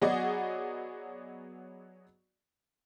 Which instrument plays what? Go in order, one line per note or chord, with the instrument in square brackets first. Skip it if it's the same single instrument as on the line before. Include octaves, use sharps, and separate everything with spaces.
[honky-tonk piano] F#3 B3 F#4 G#4 D5 D#5